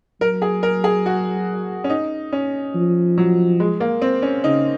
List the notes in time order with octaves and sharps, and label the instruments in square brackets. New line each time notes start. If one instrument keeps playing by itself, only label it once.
[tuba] F#3 [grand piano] A#4
[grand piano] G#4
A#4
G#4
F#4
C#4
D#4
C#4
[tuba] F3
[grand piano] F#3
G#3
A#3
C4
C#4
[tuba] C#3 [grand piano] D#4